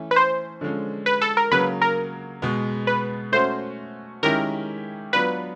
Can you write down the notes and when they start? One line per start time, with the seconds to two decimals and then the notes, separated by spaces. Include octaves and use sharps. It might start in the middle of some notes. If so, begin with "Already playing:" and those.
Already playing: E3 A3 C#4
0.11 B4
0.16 C5
0.61 D3 F3 G#3 C#4
1.06 B4
1.21 A4
1.37 A#4
1.51 C#3 F#3 A#3 B4
1.81 A#4
2.42 B2 G#3 B3
2.87 B4
3.32 A3 C#4 F#4 C5
4.23 D#3 G#3 C#4 E4 G4 A#4
5.13 F#3 B3 D4 F4 B4